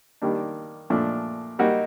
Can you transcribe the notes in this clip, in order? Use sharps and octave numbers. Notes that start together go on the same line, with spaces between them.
D#3 G3 A#3 D4
A#2 F3 A3 D4
G3 A#3 D#4 F#4